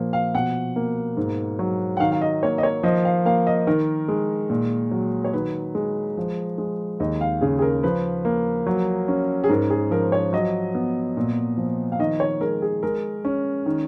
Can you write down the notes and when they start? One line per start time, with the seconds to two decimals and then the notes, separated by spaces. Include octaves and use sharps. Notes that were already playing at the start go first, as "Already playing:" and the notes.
Already playing: A#2 F3 A#3
0.13 F5
0.35 B2 F#5
0.76 A#3
1.17 G#2
1.59 F#3
1.97 F#5
2.00 D#3 F5
2.12 F5
2.21 D#5
2.43 A#3 C#5
2.58 D#5
2.63 C#5
2.83 F3 D#5
3.05 F5
3.25 A#3 F5
3.47 D#5
3.67 D#3 A#4
4.08 G#3
4.50 A#2
4.91 F#3
5.24 C#5
5.33 D#3 B4
5.75 G#3
6.17 F3
6.58 G#3
7.00 D#2 D#5
7.21 F5
7.41 C#3 G#4
7.59 G#4
7.62 A#4
7.83 F3 B4
8.25 A#3
8.67 F#3
9.08 C#4
9.44 G#4
9.49 G#2 A#4
9.70 G#4
9.91 F3 A#4
10.12 C#5
10.33 F#3 D#5
10.75 B3
11.17 A#2
11.57 F3
11.92 F5
11.99 D#3 D#5
12.20 C#5
12.41 G#3 A#4
12.62 G#4
12.83 G#3 A#4
13.25 C#4
13.66 D#3